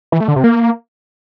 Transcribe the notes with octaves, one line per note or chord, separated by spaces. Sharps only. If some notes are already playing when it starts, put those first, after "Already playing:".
E3
A3
D3
C3
A#3